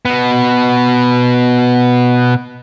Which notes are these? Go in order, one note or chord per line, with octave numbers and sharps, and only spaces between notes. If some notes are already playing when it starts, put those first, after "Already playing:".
B2 B3